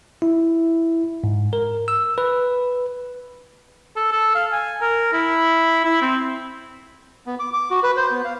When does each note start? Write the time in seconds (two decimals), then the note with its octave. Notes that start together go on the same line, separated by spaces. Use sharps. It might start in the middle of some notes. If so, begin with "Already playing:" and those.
0.22 E4
1.24 G#2
1.53 A#4
1.88 E6
2.18 B4
3.97 A4
4.12 A4
4.35 F5
4.52 G#5
4.81 A#4
5.13 E4
5.85 E4
6.02 C4
7.26 B3
7.39 D6
7.53 D6
7.70 F#4
7.83 B4
7.97 C5
8.11 B3
8.25 F5